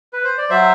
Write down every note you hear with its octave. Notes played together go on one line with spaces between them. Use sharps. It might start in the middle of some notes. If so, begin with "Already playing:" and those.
B4
C5
D5
F#3 C5 E5